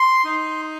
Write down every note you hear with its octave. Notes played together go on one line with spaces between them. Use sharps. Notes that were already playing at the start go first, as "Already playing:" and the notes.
Already playing: C6
D#4